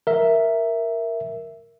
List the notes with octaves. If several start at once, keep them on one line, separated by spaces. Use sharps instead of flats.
A#4 E5